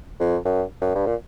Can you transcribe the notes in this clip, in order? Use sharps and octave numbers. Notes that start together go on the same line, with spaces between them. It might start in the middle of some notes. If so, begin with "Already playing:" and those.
F2
F#2
F#2
G2
A#2